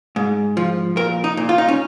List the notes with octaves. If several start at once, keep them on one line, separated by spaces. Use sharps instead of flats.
G#2
F3
A#2 A#4
D#4
A#2
F4
D#4
C#4